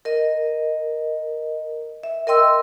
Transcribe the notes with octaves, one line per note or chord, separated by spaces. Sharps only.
A#4 D#5
E5
A#4 D#5 G5 C6 E6